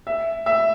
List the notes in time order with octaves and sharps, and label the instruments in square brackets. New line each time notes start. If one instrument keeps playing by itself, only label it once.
[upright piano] E5
E5